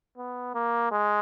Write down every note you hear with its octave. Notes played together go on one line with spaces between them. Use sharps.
B3
A#3
G#3